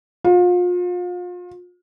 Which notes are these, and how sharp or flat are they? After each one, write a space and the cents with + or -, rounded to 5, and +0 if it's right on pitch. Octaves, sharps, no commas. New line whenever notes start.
F4 +35